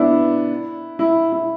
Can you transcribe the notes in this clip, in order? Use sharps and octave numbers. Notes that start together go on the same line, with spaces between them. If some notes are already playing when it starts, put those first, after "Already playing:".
Already playing: B3 D4 E4
E4
E4